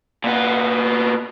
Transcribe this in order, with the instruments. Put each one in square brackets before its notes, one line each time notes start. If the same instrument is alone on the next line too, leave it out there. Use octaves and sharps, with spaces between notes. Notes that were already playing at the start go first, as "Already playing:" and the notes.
[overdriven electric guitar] A#2 B3